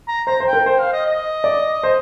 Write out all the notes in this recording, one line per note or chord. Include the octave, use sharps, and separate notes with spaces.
A#5
C5 A#5
C5
G5
A#4
C5 G5
F5
D#5
D#5
D5
C5